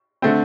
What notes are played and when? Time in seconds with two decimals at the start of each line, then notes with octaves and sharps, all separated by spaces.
0.22 D3 A3 C4